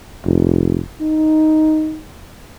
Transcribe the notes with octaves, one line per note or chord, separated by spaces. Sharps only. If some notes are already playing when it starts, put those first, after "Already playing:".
F1
D#4